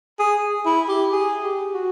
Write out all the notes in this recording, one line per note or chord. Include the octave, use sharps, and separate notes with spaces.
G#4
E4
G4
G#4
G4
F#4